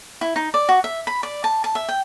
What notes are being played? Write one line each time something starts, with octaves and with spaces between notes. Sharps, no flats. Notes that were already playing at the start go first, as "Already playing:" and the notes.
E4
D#4
D5
F#4
E5
B5
D5
A5
A5
E5
G5